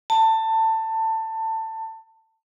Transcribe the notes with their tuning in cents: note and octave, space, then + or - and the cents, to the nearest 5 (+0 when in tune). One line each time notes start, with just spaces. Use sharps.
A5 +20